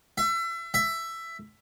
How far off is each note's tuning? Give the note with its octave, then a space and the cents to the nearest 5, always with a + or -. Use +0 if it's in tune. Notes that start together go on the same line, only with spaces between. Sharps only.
E5 +30
E5 +10